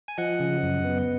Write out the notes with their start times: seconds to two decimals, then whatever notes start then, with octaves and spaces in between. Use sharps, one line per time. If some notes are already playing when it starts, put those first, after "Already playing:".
0.08 G#5
0.18 F3 D#5 F#5
0.40 C#3
0.63 F#2
0.84 B3